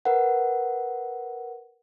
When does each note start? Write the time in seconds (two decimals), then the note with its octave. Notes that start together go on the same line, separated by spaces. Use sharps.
0.05 A#4 B4 F#5